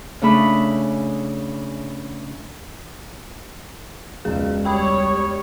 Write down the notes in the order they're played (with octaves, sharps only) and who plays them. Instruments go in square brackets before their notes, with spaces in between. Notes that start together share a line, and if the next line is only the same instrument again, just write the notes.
[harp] C#3 A3 D4 B5
[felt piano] E1 C#2 [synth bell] G#4
[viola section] G3 C#5 [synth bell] G5 B5 D#6